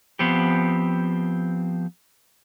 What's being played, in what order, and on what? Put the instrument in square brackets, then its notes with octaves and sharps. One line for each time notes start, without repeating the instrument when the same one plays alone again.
[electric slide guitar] F3 B3 C4 G4